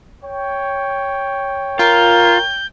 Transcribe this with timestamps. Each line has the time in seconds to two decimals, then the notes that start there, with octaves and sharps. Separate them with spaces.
0.23 C#5 G5
1.79 F4 A#4 G6